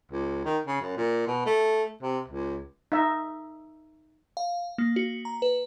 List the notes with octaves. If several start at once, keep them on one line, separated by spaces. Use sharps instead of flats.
C#2
D#3
C#3
F#2
A#2
B2
A3
C3
C#2
D#4 E5
F5
A#3
F#4
A#5
B4